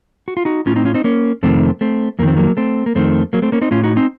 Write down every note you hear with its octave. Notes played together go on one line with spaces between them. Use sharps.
F#4
F4
D#4 F#4
A2 C#4 F4
C4 D#4
C#4 F4
C4 D#4
A#3 C#4
F2 C3 D#3 A3 C4
A3 C4
F2 D#3 A#3 C4
F#3 A#3
A3 C4
A#3
F2 D#3 A3 C4
F#3 A#3
A3 C4
A#3 C#4
C4 D#4
A2 C#4 F4
D#4 F#4
C4 D#4